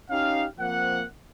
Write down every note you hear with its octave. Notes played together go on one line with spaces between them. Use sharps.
C#4 D#4 G4 F5
F3 A#3 C4 F#5